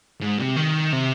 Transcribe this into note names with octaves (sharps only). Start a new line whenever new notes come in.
G#2
C3
D#3
C3